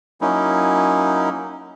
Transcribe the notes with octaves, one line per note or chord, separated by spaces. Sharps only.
F#3 A#3 C#4 D#4 E4